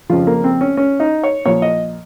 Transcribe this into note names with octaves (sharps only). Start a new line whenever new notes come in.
F2 C#3 F3 F4
A#3
C4
C#4
C#4
D#4
C#5
A#2 F3 C#5
D#5